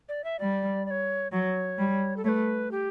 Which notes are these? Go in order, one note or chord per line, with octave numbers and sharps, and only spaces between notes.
D5
E5
G3 D5
D5
C#5
F#3 C#5
G3
A4
A3 B4 C#5
G4